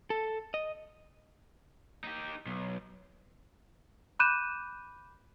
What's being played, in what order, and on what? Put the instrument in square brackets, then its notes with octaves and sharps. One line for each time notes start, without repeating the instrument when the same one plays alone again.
[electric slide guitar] A4
D#5
[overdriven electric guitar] D#4 G4
B1
[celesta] B5 D6 F#6 G6 D#7 E7